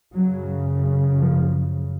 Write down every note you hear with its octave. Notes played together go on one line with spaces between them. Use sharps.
F#2 C#3 F#3
F3